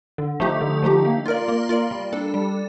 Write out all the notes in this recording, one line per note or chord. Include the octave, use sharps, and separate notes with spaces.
D3
F3 A3 D#4 G4
D3
F3 A3 D#4 G4
A#3
F4 A#4 D5
A#3
F4 A#4 D5
G3
D4 A4
G3